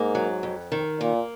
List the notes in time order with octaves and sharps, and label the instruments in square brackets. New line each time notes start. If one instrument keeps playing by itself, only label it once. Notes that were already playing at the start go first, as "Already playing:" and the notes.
Already playing: [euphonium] G#2 [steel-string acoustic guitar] A#3
[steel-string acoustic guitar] F#3
F2
D#3
[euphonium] A#2 [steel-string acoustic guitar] A#3